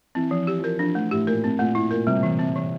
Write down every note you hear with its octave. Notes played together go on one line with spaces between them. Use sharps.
E3 C4
F3
G4
F3
A#4
F3 D4
F3 A3
A2 G4
A#2 A#4
A2 C4
A#2 A3
A2 E4
A#2 A#4
C3 G3
E3
C4
E3